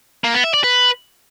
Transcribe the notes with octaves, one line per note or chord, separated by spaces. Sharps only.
A#3
B3
E5
D5
B4